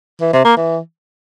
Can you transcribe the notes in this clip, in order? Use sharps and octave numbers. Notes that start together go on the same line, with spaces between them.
E3
C3
A#3
E3